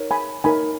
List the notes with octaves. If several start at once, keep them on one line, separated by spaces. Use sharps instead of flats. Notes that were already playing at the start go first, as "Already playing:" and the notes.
Already playing: D#4 A#4 C#5
G#5 B5
D#4 A#4 C#5 G#5 B5